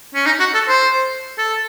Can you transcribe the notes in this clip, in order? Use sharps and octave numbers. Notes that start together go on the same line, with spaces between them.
C#4
D#4
F#4
A4
C5
A4